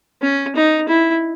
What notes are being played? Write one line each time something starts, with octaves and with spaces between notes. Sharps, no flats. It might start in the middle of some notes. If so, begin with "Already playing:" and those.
C#4
D#4
E4